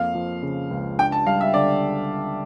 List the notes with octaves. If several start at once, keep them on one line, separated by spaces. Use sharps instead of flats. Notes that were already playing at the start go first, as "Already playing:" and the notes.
Already playing: F2 A#3 F5
F3
C#3
C#2
D4 G5
A5
G3 F5
E5
D3 D5